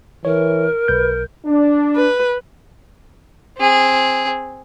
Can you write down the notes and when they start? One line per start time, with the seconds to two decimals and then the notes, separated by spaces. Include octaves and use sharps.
0.25 E3 A#4 C#5
0.88 B1 B4 G6
1.45 D4
1.96 B4
3.58 C4 G#4